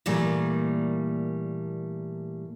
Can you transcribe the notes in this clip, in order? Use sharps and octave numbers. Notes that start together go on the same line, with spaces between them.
A#2 E3 G3 A3 A#3